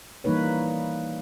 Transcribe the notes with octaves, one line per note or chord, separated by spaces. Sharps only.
E3 G3 A#3 D#4 B4 C#5